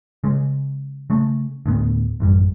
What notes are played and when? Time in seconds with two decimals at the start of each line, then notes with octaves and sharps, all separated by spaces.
0.24 C#3 G#3
1.10 C#3 A3
1.66 D2 A2 B3
2.20 A1 F#2 G3